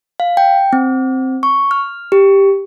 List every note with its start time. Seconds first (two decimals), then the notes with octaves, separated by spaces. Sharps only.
0.20 F5
0.37 G5
0.73 C4
1.43 C#6
1.71 F6
2.12 G4